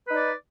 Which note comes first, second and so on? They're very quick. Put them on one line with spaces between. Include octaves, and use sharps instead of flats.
B4 D#4 D5